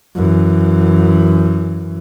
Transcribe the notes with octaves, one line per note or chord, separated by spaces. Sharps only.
F#2 E3